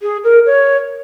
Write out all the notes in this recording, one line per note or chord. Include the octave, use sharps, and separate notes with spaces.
G#4
A#4
C#5